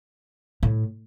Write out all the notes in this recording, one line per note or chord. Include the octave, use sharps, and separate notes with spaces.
A2